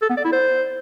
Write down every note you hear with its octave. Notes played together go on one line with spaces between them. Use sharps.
A4
B3
D5
E4
C5